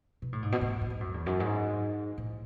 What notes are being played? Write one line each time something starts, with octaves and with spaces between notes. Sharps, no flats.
B2
A2
G#2
B2
A2
A2
G#2
F#2
E2
F#2
G#2
A2